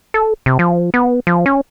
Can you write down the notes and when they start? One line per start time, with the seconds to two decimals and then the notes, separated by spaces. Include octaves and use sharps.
0.14 A4
0.46 C3
0.59 F3
0.94 B3
1.27 F3
1.46 C#4